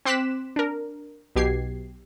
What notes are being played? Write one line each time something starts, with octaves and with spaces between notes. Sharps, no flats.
C4 C6 D6 F#6 B6 E7
D4 A#4
B1 B2 G4 G#6 C7